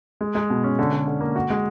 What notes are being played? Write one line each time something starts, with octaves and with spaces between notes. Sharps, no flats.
G#3
G#3
B2
C#4
D3
D3
D3
A#3
F#4
G#3